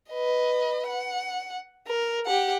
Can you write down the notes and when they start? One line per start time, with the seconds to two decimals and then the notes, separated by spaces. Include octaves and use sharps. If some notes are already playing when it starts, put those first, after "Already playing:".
0.11 B4 D#5
0.87 F#5
1.87 A#4
2.26 G4 F#5